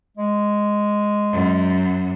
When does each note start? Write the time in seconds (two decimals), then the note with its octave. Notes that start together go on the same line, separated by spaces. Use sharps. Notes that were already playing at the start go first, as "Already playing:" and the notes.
0.17 G#3
1.32 F#2